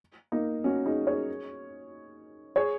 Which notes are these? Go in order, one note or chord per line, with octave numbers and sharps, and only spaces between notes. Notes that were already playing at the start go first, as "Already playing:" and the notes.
A#3 D#4
C#4 F#4
D#4 G#4
G#4 C#5
G#4 C#5